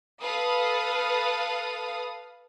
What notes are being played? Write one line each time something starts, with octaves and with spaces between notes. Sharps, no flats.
A4 B4 F5 D#6